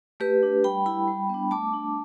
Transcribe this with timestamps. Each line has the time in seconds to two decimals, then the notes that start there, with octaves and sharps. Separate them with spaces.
0.20 A3 G4 B4
0.43 D4
0.64 G3 G5 B5
0.86 E4 G5 B5
1.08 G3
1.29 B3 D4
1.51 A3 A5 D6
1.73 D4